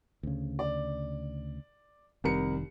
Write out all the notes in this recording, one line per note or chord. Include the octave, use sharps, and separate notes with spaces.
D2 C#3
D5
F1 C2 D#3 A#4 C#7